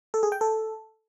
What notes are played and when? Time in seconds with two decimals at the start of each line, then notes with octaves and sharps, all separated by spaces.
0.14 A4
0.23 G#4
0.32 G5
0.41 A4